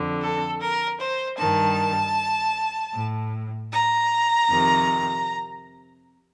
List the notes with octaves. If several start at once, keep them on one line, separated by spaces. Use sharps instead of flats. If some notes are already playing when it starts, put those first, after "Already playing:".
Already playing: F2 D3
A4
A#4
C5
G2 D#3 A5
A2
A#5
F2 C3 D#3